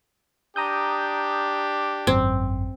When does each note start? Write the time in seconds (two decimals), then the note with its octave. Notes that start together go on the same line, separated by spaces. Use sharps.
0.56 D4 G4 A#5 D#6 G6
2.07 G#1 F#2 C4